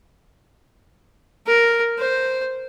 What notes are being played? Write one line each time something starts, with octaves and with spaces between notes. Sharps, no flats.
A#4
C5